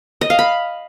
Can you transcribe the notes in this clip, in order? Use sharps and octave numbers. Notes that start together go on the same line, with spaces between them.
D#5
F5
B5